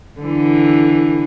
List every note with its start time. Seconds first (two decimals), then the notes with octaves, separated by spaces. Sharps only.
0.21 D3 E3